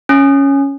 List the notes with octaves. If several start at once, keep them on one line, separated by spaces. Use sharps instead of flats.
C#4